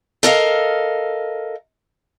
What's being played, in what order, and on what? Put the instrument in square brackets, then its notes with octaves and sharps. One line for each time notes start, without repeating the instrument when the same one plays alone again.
[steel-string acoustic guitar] A4 A#4 D#5 F5